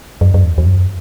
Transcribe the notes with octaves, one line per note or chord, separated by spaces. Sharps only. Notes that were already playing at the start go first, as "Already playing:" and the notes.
F#2
F#2
E2
E2
F#2